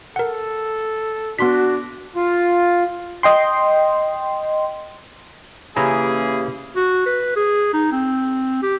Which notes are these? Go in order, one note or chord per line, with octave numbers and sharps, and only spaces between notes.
A4 A#4 F#5
B3 D4 F#4 C6 B6
F4
D#5 G5 C6
C#3 E3 A#3 C#4 E4 G4 G#4 A#5
F#4
B4
G#4
D#4
C4
G4